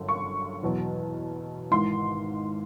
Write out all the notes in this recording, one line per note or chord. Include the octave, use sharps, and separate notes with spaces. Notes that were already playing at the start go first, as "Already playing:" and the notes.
Already playing: G1 F#2 D3
C#6
E2 B2 F#3
G#1 G#2 E3 C6